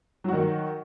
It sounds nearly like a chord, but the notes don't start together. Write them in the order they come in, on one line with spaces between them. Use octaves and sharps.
F#3 F#4 D#3